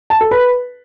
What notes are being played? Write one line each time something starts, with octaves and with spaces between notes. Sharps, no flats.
A5
A4
B4